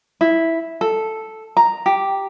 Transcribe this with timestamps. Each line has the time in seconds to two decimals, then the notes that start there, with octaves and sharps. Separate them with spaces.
0.21 E4
0.81 A4
1.57 A#5
1.86 G4